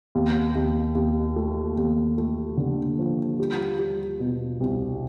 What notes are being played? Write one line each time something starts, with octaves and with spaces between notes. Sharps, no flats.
D#2
D#2
D#2
A3
D#2
A3
D3
F3
G3
G3
B2
C2